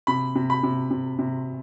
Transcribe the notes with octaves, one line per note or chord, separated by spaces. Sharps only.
C3 B5
C3
B5
C3
C3
C3